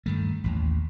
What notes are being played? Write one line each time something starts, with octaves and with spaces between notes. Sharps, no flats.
G2 D#3 A3
A1 D#2